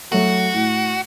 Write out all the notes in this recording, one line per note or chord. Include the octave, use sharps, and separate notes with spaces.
F#3 A3 F#4
A2